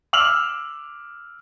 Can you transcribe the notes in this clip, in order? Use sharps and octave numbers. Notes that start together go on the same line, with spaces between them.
D6 E6 F6 F7 F#7